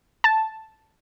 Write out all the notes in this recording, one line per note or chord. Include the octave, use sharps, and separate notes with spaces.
A5